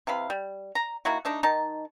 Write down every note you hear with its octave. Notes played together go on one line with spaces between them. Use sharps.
C3 E3 F5 B5
G3
A#5
D#3 A#3 E4 F#4
A3 D4 D#4
D#3 D#4 A5